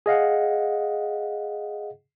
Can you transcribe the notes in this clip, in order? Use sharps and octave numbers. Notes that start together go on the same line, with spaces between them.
G#4 D#5 F5 F#5